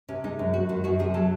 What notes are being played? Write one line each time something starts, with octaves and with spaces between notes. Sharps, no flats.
C3 C#4
G#3 D#4
F#2
F#2 F#4
D#3 F#4
F#2 F#4
C3 G#4
F#3 A4